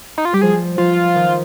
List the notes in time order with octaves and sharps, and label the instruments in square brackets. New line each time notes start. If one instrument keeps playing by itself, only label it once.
[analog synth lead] D#4
F4
[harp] G3 [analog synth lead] G4
[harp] F3 [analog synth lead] G#4
[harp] F3 [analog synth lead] F4
[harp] D#3